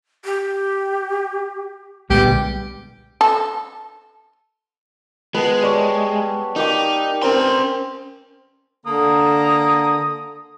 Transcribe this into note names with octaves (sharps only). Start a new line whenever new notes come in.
G4
B1 A#2 D3 G3 G#3 B3 G4
A4
G#3 B3 B4 A5
G3 C#5
A#3 D#4 G4 D6
C4 C#4 A#4 A#5 C6
D3 A#3 A5 A#5 D#6